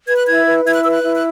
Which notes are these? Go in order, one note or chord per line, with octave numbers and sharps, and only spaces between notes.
B4 G#6
F#6
E4 G#6
B4
E4 G#6
F#6
B4 E6
F#6
E4
F#6